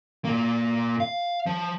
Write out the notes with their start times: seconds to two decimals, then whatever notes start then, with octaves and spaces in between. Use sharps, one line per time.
0.25 A#2 A#3
1.00 F5
1.46 F3